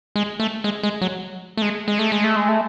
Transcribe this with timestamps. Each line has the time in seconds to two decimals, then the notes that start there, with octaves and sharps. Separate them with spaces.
0.16 G#3
0.40 A3
0.64 G#3
0.83 G#3
1.01 F#3
1.57 A3
1.62 G#3
1.88 G#3
1.99 A3
2.12 G#3
2.24 A3
2.36 G#3
2.48 A3